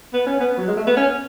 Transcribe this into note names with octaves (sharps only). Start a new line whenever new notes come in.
B3
C#4
B3
F#3
G#3
A3
B3
C#4